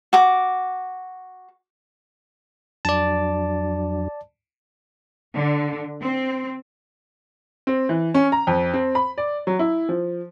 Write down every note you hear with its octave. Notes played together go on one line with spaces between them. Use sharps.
F#4 D6
F2 F#3 D4 D5 A5
D3
C4
C4
E3
C#4
A#5
F2
C4
B5
D5
F#3
E4
F3